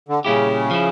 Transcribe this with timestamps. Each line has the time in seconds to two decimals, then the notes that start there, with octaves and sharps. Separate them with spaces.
0.09 D3
0.24 A#2 C#3 G3 C#4 E4 G4
0.71 F3 C#4 E4